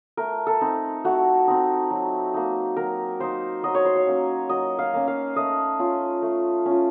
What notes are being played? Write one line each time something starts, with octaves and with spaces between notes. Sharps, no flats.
A3 A#4
A4
C4 D#4
A3 F#4
C4 D#4
F#3
A#3 D#4
F#3 A#4
A#3 D#4 C5
F#3 D#5
C#5
C5
C#5
A#3 C#4
F#3 D#5
F5
A#3 C#4
F5
A3 D#5
C#4 F4
A3
C#4 F4